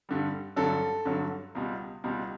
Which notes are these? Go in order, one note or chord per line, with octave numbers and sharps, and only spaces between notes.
G2 D3 G3
G2 D3 F#3 A4
G2 D3 F#3
C#2 B2 G3
C#2 B2 G3